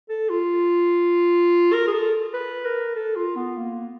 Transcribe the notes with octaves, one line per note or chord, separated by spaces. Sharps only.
A4
F4
A#4
G#4
A4
B4
A#4
A4
F4
B3
A#3